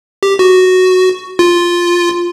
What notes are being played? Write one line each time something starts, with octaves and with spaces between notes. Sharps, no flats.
G4
F#4
F4